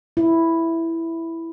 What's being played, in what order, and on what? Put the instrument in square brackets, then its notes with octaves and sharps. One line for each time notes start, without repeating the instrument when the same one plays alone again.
[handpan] E4